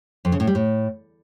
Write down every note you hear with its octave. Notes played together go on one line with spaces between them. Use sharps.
F2
C#3
A2
G3
A2